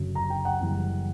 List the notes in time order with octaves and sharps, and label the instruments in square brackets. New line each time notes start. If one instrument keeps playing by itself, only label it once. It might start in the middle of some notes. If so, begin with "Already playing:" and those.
Already playing: [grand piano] F#1 F#2 D3 F#3
A#5
G5
F#5
F#1 F#2 E3 G3